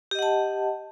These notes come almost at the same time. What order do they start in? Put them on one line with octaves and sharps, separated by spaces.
G4 D#5 F#5 A5